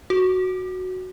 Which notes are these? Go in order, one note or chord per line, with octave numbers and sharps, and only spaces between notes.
F#4